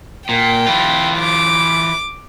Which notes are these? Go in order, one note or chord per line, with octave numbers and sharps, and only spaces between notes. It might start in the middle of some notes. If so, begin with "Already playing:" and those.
A#2 G5
E3 F4
D6